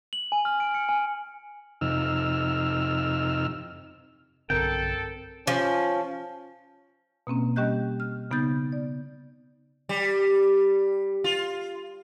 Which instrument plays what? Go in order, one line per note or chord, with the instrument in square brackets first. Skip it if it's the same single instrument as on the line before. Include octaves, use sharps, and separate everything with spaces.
[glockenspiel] F#7
G#5
F6
D7
C#7
G#5
[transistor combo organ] F2 C3 D#4 E6 F6
[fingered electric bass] B1 G2 D3 [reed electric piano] C4 A#4 [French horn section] A4 [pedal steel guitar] G5
[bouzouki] F3 [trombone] C#4
[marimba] B2 A#3 C4 C#4
G3 C#4 G4 D#5 F#6 G6
F6
C#3 B3 D#4 G6 A6
D5
[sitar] G3
F4